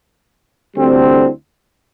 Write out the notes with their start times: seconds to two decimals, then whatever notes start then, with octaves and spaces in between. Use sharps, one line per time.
0.76 D2 D3 G3 C4 E4